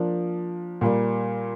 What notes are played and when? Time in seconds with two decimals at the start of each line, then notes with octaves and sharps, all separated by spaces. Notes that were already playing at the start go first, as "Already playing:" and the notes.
Already playing: F3 A#3 D4
0.81 A#2 G3 A#3